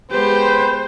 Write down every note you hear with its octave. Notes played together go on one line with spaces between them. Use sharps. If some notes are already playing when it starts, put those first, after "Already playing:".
G#3 B3 G4 B4 C5